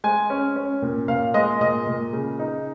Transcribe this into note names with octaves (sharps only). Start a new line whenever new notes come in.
G#3 G#5
C#4
C#4
A#2
A#2 F5
G#3 D#5
A#2 D#5
A#2
C#3
D#4